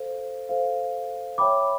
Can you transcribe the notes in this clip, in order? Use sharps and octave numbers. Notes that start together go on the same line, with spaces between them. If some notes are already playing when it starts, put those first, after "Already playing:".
Already playing: A4 C5 F5
A4 C5 F5
C#5 E5 G5 B5 D6